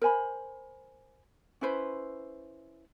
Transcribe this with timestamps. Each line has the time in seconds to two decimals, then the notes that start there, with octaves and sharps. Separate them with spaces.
0.02 A#4 C5 G#5 B5
1.61 C#4 E4 B4 C5